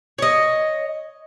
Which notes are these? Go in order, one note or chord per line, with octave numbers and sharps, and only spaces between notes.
C#5 D#5